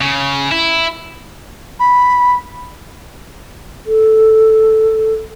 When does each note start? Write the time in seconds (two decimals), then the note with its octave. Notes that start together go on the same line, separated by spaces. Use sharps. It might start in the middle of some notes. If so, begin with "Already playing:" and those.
0.01 C#3
0.52 E4
1.80 B5
3.86 A4